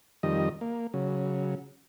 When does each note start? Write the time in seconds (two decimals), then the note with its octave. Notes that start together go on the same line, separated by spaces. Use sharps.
0.23 F2 D#3 G3 D#5
0.61 A#3
0.94 C#3 F#3